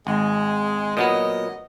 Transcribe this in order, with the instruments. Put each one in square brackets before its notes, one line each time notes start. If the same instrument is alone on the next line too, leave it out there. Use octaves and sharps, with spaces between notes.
[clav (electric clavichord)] G#1 [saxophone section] G#3
[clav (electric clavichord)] A#2 F#3 B3 [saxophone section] D#5